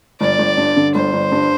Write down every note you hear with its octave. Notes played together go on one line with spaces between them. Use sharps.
G1 D5
G1
G2
D3
G1 C5
G1
G2